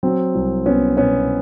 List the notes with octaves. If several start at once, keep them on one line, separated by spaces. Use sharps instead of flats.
F#3 C4
C2
C2 B3 C#4
B2 B3 C#4